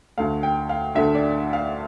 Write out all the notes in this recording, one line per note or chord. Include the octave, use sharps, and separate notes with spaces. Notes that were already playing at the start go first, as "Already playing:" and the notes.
D2 D3 A3 F5
G5
F5
D2 D3 A3 E5
D5
F5